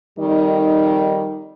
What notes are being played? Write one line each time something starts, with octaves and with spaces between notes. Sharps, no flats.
F2 D#3 G3 D#4